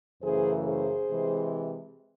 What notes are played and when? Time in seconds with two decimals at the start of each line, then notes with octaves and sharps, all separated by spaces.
0.23 F#2 C#3 E3 A3 G#4 C5
0.66 G#4 C5
1.10 C3 E3 G#3